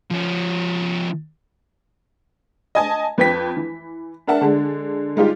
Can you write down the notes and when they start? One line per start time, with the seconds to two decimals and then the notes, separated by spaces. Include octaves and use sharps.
0.11 F3 C#4
2.75 D#5 G#5 A5
3.18 F2 B4 G5 B6
3.57 E3
4.27 D4 A#4 E5 F#5 A5
4.41 D3 G#3 D4
5.16 G3 G#3 D#4 F4 G4